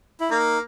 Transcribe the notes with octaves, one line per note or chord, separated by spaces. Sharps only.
E4
A#3 D#4